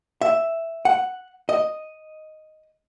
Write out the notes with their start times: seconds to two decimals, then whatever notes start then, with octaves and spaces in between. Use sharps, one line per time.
0.21 E5
0.85 F#5
1.49 D#5